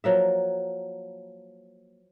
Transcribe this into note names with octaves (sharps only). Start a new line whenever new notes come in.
F3 F#3 A#3 E5